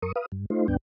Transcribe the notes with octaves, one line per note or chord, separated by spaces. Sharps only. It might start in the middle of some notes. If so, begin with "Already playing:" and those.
F#2 A#4 C#6 D#6
B4 F5 D#6
G2
A3 D#4 F4 C5
D2 G2 B3 D4 G5